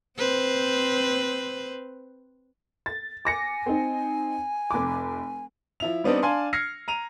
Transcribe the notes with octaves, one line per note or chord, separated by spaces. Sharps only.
C4 B4 C5
A6
G#5 D6 A#6 C#7
C4 D#4
F1 D6
F3 E4 F7
G3 B3 C4 D4 D#4
D4 F5 G#5 A5 C6
F6 G#6 A#6 C7 C#7
A#5 D#7 F7